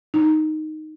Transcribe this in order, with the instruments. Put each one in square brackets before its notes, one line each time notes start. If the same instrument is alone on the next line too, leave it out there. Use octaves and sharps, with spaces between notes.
[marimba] D#4